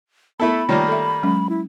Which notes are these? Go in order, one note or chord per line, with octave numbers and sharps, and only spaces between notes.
A3 B3 E4 A4 B5
D#3 G3 A3 A#3 F4 C#5
A4 E5
F#3 G#3 C#4
E4